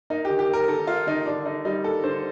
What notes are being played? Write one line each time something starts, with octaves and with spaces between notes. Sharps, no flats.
A#3 D#4
D#3 G4
G4
A#3 A#4
D#3 A4
A#3 F4
D#3 D#4
D3 D4
D3 D#4
G3 D#4
A#3 A4
D3 C5